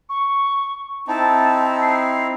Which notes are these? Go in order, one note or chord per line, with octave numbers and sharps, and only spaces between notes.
C#6
C4 D#4 E4 A5
A5
C7